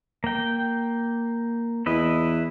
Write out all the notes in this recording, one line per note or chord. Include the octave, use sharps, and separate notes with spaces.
A#3 G5
E2 E4 B4 D#5